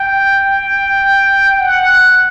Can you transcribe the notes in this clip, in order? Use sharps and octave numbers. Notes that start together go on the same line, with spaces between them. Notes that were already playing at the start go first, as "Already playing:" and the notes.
Already playing: G5
F#5